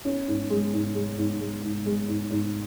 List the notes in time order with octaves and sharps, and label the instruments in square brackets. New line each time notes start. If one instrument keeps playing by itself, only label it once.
[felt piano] C#4
G#2
G#3
G#2
G#3
G#2
G#3
G#2
G#3
G#2
G#2